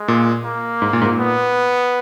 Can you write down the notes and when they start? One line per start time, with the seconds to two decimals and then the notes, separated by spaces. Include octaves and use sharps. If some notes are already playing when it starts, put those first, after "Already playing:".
Already playing: G#3
0.08 A#2
0.45 A#3
0.82 G#2
0.93 A#2
1.02 G#2
1.06 A#2
1.18 B3